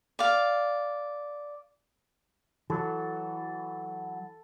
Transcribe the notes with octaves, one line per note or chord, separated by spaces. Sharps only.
D5 F5
E3 F#3 F#4 A4